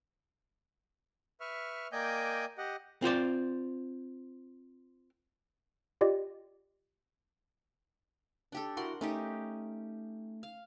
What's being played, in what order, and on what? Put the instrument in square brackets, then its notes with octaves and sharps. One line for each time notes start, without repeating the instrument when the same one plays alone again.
[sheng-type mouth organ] B4 E5 C#6 F6
A#3 D5 D#5 G5 G#5 G6
G4 D#5 F#5
[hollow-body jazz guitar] C4 F4 C5 D5
[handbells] F4 G4 D5 D#5
[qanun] D4 G4 A4
[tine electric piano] E4 F#4 [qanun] A#4 F#5 C6
[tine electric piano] A3 [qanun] C#4 D#4 G4
[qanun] F5